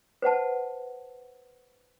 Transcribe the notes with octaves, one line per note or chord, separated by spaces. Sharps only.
B4 C5 F#5 A5